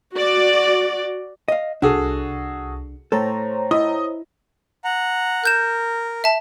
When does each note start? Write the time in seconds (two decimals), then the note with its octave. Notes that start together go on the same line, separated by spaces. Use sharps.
0.13 F#4 D5
1.48 D#5 F5
1.82 C2 D4 F#4 G#4 A4
3.12 A2 A4 C5 C#5 A#5
3.71 E4 D#5
4.84 F#5 A#5
5.44 A#4 F#6 G6 E7
6.24 E5 A5